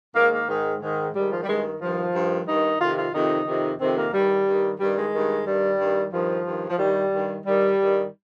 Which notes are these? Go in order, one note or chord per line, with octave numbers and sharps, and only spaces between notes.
G#2 D#3 A#3
A#3
G#2 D#3
G#2 D#3
G#2 D#3 G3
F3
G3
G2 D#3 G#3
G2 D#3 F3
G2 D#3
G2 D#3 D#4
F2 C3 D#3 F4
F4
F2 C3 D#3 D#4
F2 C3 D#3
F2 C3 D#3 C4
A#3
G2 D#3 G3
G2 D#3
G2 D#3 G3
G#3
G2 D#3
G2 D#3 G3
G2 D#3
G2 D#3 F3
G2 D#3
F3
G2 D#3 G3
G2 D#3
G2 D#3 G3
G2 D#3